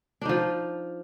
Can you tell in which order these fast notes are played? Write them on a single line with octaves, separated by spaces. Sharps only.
D4 D#4 F3